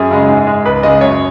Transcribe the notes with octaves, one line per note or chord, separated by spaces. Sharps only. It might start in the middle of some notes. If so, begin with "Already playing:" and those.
Already playing: F#2 G#4
C#3 G#3
G#2
G#3
C#2 B4
C#3 G#3 D#5
F#2 C#5